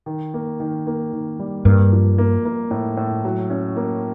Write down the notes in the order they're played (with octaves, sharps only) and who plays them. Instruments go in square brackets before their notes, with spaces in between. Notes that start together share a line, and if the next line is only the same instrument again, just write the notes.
[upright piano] D#3
A#3
D#3
A#3
D#3
G3
[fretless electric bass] G2 [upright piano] A#3
[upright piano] F3
A#3
A#3
A2
A2
F#3
C#4
A#3